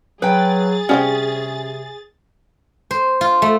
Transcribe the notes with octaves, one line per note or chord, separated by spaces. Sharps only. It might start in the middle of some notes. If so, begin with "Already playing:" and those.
F#3 G#4 B4 G5 A6
C3 G3 C4 C#4 G5
C5
F4
A3